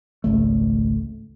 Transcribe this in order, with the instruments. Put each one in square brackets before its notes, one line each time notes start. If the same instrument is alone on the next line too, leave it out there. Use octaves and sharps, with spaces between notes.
[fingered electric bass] G#1 C#2 A3